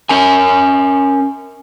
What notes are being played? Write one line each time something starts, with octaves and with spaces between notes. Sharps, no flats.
C#4 A#4 G#5